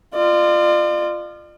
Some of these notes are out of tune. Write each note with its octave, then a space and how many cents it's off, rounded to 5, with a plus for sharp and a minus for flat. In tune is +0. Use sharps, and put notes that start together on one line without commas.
F4 -10 D5 +40